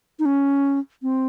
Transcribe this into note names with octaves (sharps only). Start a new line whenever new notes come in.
D#4
C#4
C4